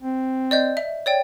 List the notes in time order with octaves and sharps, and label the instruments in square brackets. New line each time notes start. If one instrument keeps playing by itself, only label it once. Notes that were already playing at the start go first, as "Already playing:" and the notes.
[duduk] C4
[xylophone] D5 D#5 G6
E5
C#5 D5 G5